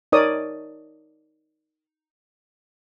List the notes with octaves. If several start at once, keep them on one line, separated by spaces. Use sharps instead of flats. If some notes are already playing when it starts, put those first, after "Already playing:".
D#4 A#4 C#5 D5 D#6